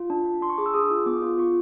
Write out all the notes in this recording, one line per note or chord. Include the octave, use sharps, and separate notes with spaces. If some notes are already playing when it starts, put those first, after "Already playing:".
Already playing: F4
D4
D4
D4 C6
C#6
G#4 D6
E6
G#4 D#6
F4
B3 D6
F4
F4 C#6